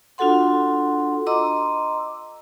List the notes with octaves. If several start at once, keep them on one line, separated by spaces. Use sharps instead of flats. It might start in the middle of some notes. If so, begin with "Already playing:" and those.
D4 F4 F#4 A4 F#5 C6
D#5 A#5 C6 D6 E6